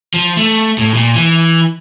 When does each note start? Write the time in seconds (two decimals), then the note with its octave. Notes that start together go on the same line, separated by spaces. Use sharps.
0.14 F3
0.37 A3
0.78 A2
0.94 A#2
1.15 E3